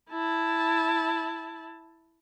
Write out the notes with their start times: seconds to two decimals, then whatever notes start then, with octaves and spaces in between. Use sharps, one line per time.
0.10 E4 A5